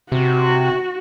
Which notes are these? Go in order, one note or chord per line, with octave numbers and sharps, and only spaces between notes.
C3 F#4